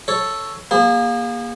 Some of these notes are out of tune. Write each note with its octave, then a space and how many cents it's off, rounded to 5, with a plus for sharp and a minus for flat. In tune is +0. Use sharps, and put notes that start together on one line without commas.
A4 +0 C#5 +0
A#3 +20 G#4 -35